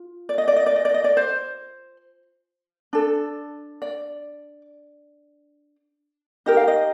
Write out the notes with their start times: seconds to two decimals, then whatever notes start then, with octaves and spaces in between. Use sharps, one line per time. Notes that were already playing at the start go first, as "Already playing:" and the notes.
Already playing: F4
0.29 D5
0.38 D#5
0.48 D5
0.56 D#5
0.66 D5
0.76 D#5
0.85 D5
0.94 D#5
1.04 D5
1.17 C5
2.93 D4 A4
3.82 D5
6.46 D#4 G4 A#4 D#5
6.57 F5
6.68 D#5